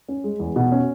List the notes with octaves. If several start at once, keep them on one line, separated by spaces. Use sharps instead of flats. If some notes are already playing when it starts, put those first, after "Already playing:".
C#4
G#3
E2
B2
C#4